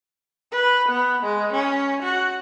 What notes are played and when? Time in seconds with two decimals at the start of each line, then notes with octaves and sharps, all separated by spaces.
0.51 B4
0.88 B3
1.22 G#3
1.53 C#4
2.03 F#4